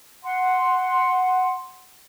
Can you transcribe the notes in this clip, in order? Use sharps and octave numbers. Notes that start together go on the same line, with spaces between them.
F#5 C6